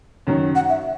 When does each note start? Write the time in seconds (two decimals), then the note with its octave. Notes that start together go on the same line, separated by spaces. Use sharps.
0.27 F#2 D#3 F#3
0.55 F#5
0.70 E5